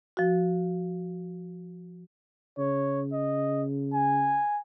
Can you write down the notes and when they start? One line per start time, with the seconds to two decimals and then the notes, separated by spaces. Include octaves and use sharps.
0.17 F3 F#4
2.58 C#3 C#5
3.13 D#5
3.94 G#5